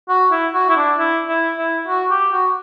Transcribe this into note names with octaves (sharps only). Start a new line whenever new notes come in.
F#4
E4
F#4
E4
D4
E4
E4
E4
F#4
G4
F#4